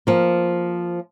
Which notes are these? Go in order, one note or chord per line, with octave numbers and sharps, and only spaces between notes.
F3 A#3